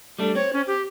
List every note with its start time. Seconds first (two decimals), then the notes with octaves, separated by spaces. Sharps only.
0.19 G3 A3 D4
0.35 C4 C#5
0.53 C#4
0.67 G4